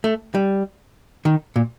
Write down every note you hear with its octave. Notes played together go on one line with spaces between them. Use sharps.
A3
G3
D#3
A#2